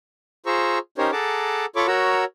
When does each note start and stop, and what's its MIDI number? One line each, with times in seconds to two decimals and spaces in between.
0.46 0.79 65
0.46 0.79 68
0.46 0.79 72
0.46 0.79 82
0.46 0.79 85
0.46 0.79 88
0.98 1.11 61
0.98 1.11 63
0.98 1.11 67
0.98 1.11 70
0.98 1.11 72
0.98 1.11 73
1.12 1.66 68
1.12 1.66 69
1.12 1.66 78
1.12 1.66 81
1.12 1.66 82
1.12 1.66 86
1.76 1.87 65
1.76 1.87 69
1.76 1.87 73
1.76 1.87 83
1.76 1.87 85
1.76 1.87 86
1.87 2.24 66
1.87 2.24 70
1.87 2.24 73
1.87 2.24 78
1.87 2.24 82
1.87 2.24 88